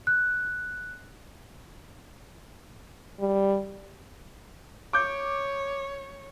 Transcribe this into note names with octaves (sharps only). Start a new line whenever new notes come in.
F#6
G3
C#5 D6 G6